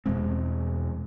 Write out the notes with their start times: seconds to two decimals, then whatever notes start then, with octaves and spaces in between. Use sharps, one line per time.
0.06 E2 B2 G#3 C4